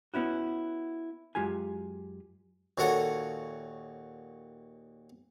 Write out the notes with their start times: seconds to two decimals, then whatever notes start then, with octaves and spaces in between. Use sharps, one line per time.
0.14 B3 C#4 E4 F#4
1.35 F#2 G#3 F4 G4 G#5
2.78 D#2 A#2 F#4 A4 C#5 F#5